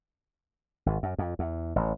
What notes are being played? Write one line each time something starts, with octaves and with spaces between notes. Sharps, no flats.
G#1
F#2
F2
E2
A1